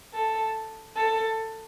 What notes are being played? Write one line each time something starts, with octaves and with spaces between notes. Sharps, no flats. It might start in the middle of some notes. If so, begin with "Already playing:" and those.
A4
A4